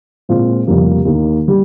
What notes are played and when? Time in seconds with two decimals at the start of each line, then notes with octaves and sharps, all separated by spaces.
0.29 A#2 G#3 C4 F4
0.67 F1 F2 C#3 G3 A#3
1.05 D#2 D#3 A#3
1.48 G3